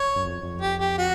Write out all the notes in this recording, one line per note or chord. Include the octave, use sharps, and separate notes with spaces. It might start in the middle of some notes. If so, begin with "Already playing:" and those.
Already playing: C#5
F#2
F2
F2
G4
G4
F#4